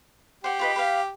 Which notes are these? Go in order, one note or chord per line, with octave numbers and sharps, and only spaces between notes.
G4 C5 F#5
F4 B4 D#5
B4 F5